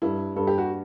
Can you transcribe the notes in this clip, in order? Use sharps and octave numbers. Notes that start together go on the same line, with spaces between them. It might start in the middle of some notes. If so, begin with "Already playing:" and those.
G2 E4
G2 A4
G4
F#4